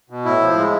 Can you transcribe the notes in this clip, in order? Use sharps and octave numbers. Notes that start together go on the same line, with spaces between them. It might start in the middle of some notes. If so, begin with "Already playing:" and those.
B2
A2 E4
F3
G#3